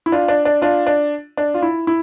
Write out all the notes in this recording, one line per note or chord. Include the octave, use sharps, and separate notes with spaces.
E4
D4 F4
D4
D4
D4 F4
D4
D4
F4
E4
E4